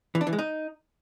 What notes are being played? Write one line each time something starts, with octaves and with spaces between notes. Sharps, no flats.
E3
D4
E3
G#3
D#4